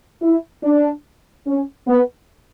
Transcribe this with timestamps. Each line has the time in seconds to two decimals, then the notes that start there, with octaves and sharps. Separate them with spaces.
0.22 E4
0.63 D4
1.47 C#4
1.88 B3